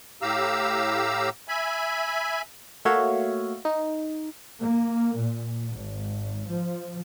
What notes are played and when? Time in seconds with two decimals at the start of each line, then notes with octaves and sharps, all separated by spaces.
0.22 A2 G4 F5 A#5 E6
1.48 E5 G#5 B5
2.85 A3 A#3 F#4 C#5 E5 F5
3.65 D#4
4.60 A#3
5.17 A#2
5.73 G#1
6.47 F3